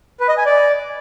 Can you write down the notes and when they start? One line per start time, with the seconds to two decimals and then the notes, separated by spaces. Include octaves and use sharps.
0.20 B4
0.29 D#5
0.37 G#5
0.46 D5